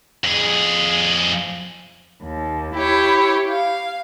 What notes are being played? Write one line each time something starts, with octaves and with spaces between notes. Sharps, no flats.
F2 G#4
D#2
E4 G4 C#5
F5